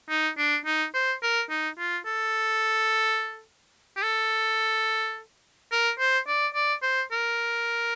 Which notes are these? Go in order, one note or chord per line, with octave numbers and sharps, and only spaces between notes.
D#4
D4
D#4
C5
A#4
D#4
F4
A4
G4
A4
A#4
C5
D5
D5
C5
A#4